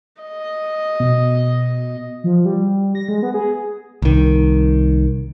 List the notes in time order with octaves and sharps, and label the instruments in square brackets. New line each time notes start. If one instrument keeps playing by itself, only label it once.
[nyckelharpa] D#5
[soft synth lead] B2
[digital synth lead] F3
G3
A#6
G#3
B3
G#4
[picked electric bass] C2 D#3